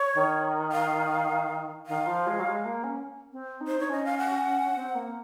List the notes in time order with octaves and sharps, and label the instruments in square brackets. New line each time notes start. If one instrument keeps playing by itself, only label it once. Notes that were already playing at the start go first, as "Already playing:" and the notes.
Already playing: [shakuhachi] C#5
[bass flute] D#3
[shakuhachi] F5
[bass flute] D#3 [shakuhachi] F5
[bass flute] F3
G#3
F#3
G#3
A#3
C#4
C4
D#4
[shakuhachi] C5
[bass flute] D#4 [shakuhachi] C#5
[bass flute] C#4 [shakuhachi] D#5
[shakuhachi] F5
F#5
[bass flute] C4
A#3